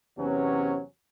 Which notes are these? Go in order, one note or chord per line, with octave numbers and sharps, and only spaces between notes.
E2 C3 F#3 B3 C#4